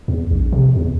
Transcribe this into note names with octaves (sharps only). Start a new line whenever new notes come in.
E2
A#1
C3
E2